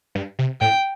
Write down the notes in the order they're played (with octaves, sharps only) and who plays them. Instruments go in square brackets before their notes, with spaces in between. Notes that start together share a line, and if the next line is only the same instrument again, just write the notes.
[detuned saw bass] G2
C3
[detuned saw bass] A2 [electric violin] G5